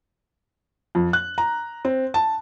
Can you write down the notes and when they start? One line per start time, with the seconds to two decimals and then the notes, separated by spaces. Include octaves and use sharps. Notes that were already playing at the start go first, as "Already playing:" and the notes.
0.95 F2
1.13 F#6
1.38 A#5
1.85 C4
2.14 A5